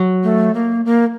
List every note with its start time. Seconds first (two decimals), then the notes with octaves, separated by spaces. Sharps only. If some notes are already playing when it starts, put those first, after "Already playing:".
Already playing: F#3
0.23 A3
0.54 A#3
0.85 A#3